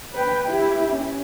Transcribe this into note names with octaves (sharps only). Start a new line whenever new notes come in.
B4 G5
E4 G4
C#4